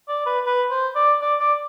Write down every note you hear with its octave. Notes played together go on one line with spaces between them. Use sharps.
D5
B4
B4
C5
D5
D5
D5